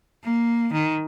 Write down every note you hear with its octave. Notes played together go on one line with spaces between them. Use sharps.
A#3
D#3